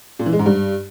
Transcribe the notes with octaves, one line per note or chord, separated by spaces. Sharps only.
A#2
E3
G#3
G#2
G2